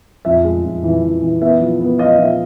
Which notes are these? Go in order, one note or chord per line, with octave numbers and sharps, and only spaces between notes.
F2 E5
G#3
F2
E3
E3
E3
B3 E5
F3
B3
F3 D#5 F5
F3 E5